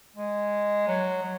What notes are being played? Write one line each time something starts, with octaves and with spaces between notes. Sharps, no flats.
G#3
F#3
F#3